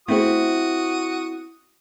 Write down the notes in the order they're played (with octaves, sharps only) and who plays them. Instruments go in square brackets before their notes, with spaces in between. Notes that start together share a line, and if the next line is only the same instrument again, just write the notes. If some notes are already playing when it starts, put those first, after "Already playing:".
[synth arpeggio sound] A3 B3 G#4 [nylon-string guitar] C4 E4 [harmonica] F#4 D#6